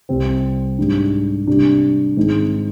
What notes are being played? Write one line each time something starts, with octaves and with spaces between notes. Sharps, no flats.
C2 C3 G3 C4
G#2 G3 D4
C3 G3 D4
G#2 D#3 G#3 C4 D#4